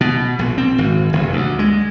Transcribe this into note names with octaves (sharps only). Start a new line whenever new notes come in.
B2
A#1
C4
G#1
F1
D2
G#3